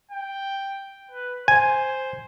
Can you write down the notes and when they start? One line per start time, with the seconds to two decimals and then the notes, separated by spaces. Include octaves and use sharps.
0.12 G5
1.11 B4
1.48 C5 G#5